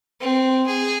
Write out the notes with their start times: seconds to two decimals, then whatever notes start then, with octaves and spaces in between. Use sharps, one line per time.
0.21 C4
0.67 G#4